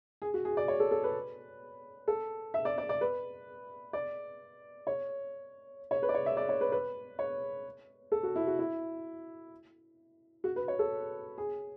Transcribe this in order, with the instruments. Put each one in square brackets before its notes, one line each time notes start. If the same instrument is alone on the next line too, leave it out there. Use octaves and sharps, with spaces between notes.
[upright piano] G#4
F#4
G#4
D5
C#5
A4
A4
B4
A4
E5
D5
D5
D5
B4
D5
C#5
C#5
B4
D5
C#5
E5
D5
C#5
B4
B4
C#5
A4
F#4
E4
F#4
E4
F#4
B4
C#5
A4
G#4